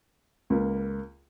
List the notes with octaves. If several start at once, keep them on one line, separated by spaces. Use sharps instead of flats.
C#2 A#3